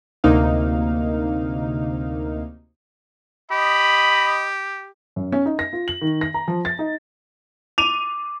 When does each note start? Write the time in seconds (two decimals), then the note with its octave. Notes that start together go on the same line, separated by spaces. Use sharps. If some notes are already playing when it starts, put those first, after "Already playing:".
0.24 D2 C3 A#3 D#4 F5
3.51 G4 D#5 B5
5.16 F#2
5.32 C#4
5.46 D#4
5.59 A#6
5.73 F4
5.88 F#7
6.01 D#3
6.21 A#6
6.34 A#5
6.48 F3
6.65 A6
6.79 D#4
7.78 D6 D#7 F7